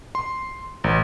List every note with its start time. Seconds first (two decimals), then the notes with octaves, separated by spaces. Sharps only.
0.15 C6
0.84 A1